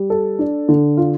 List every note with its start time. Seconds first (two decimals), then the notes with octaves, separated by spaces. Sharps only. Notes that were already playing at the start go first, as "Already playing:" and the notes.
Already playing: G3
0.10 A4
0.39 D4
0.69 D3
0.97 F4